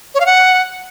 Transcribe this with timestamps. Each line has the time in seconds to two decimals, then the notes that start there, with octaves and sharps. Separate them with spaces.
0.15 C#5
0.20 F5
0.26 F#5